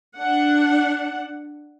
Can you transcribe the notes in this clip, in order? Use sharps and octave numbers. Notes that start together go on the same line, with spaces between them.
D4 F#5